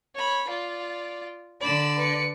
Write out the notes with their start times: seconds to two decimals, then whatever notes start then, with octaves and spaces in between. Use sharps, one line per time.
0.15 C#5 B5
0.48 F4 D5
1.61 D3 D5 B5 E7
1.97 B4 C#7